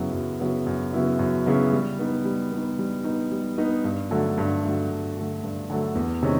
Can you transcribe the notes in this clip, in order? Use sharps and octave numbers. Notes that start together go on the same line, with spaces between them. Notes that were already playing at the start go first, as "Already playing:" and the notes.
Already playing: F#2 C#3 F#3 B3 E4
F#2
C#3 F#3 B3 E4
F#2
C#3 F#3 B3 E4
F#2
C#3 F#3 B3 E4
G3
B3 D#4
G3
B3 D#4
G3
B3 D#4
G3
B3 D#4
G2
D3 F#3 A3
G2
D3 F#3 A3
G2
D3 F#3 A3
G2
D3 F#3 A3
E2
C3 D#3 G#3 C#4